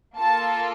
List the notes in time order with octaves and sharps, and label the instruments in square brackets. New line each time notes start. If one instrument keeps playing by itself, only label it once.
[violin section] A#3 F4 A4 A5